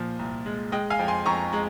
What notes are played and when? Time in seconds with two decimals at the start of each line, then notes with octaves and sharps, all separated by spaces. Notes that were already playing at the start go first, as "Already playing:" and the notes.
Already playing: A#2 F3 C5
0.19 C2
0.46 G#3
0.72 G#3 D#5 G5
0.90 F5 G#5
0.99 F2
1.08 G#5 C6
1.26 F2 A#5 C#6
1.53 G#3